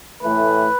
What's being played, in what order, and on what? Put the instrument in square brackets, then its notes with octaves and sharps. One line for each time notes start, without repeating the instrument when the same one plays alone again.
[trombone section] A2 E3 A3 B4